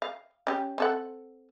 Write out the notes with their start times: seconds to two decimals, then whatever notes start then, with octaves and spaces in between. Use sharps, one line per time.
0.02 F5
0.47 C#4 G4
0.78 C4 A4 F#5